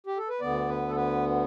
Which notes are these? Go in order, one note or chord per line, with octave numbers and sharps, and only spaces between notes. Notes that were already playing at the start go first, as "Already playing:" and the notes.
G4
A4
B4
D2 D3 B3 D5
B4
A4
B4